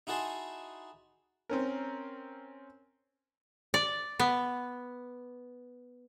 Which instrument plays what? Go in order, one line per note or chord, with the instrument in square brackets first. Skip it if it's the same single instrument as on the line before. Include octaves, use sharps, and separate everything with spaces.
[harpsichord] D#4 E4 F#4 G#4 A5 C6
[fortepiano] C4 C#4 A#4
[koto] D5
B3